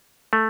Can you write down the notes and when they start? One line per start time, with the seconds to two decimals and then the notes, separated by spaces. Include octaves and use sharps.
0.33 A3